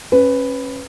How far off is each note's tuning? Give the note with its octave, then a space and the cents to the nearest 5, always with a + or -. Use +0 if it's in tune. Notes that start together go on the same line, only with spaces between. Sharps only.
C#4 -25 B4 +5